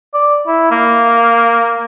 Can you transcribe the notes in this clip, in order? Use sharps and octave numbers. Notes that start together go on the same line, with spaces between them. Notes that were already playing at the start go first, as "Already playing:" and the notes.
D5
E4
A#3